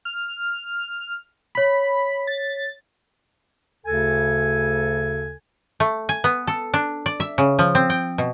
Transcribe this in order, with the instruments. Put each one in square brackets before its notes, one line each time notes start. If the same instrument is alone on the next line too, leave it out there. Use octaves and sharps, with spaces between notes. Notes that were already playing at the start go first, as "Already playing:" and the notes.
[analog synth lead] F6
[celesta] C#5 B6 [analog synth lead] B5
[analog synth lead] A6
[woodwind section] D2 C#3 A4 G#5
[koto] A3
G#5
B3
A4
D4
D5
E5
C#3
F3
C4
G5
B2